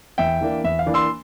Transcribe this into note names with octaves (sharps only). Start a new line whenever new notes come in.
E2 E5 G5
E3 A#3 D4
E2 E5
F5
E3 A#3 D4
C6 E6